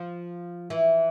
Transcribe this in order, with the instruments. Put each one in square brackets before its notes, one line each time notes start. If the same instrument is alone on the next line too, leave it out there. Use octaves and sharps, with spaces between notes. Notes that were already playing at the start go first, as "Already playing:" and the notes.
Already playing: [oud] F3
E3